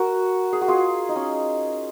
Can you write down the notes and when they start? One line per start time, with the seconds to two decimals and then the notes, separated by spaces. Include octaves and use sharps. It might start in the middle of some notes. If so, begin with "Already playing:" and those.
Already playing: F#4 A#4
0.53 G#4
0.61 F#4
0.68 F4 G#4
1.09 D#4
1.16 C#4